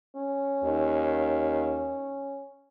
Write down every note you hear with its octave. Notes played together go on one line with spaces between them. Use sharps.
C#4
D#2